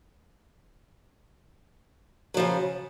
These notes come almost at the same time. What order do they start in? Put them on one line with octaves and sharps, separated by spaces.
F#3 F3 C#3